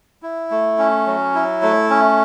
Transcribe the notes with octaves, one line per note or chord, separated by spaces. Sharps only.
E4
A3
C#4
F#3
E4
A3
C#4